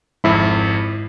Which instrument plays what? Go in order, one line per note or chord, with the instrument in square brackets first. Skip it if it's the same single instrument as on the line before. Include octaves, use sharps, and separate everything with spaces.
[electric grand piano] G#1 F2 B5 [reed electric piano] G#2 E4